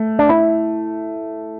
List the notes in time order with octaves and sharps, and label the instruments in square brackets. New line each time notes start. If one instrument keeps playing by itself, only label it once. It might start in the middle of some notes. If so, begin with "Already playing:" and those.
Already playing: [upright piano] A3
[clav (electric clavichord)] D4
E4